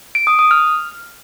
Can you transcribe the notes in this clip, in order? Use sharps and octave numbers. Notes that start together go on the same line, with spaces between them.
D7
D#6
D#6
F6